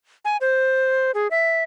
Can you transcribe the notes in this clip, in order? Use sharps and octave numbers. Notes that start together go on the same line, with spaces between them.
G#5
C5
G#4
E5